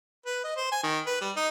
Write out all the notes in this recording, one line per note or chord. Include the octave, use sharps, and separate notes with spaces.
B4
D#5
C5
G#5
D#3
B4
G3
D#4